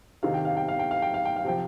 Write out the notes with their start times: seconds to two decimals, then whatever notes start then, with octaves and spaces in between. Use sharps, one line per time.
0.23 C3 D#3 F5
0.34 G5
0.45 F5
0.57 G5
0.68 F5
0.79 G5
0.91 F5
1.02 G5
1.14 F5
1.25 G5
1.36 F5
1.44 C3 F3 G5